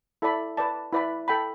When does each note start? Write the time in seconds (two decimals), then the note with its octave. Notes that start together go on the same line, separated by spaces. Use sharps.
0.22 E4 A4 D5 B5
0.57 B4 D5 A5
0.93 E4 B4 D5 B5
1.28 A4 G5 B5